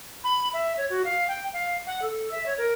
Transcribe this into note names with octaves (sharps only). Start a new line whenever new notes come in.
B5
E5
C#5
F#4
F5
G5
F5
F#5
A4
E5
C#5
A#4